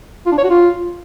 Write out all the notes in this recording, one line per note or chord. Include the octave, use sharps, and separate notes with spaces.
F4
D4
C#5
F#4
F4